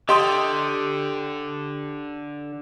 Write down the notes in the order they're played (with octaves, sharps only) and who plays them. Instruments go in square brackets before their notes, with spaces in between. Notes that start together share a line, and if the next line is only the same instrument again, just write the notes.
[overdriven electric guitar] D3 [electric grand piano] G4 G5 D#6 [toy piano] D#5 C6